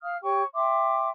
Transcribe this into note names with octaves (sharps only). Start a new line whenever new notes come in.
F5 D#6 F6
G4 C#5 G5 C#6
E5 G5 C6 D6